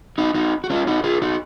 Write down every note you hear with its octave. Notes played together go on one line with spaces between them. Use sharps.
D#4 F#4
D#4 F#4
F#4
C#4 F4
D#4 F#4
F4 G#4
D#4 F#4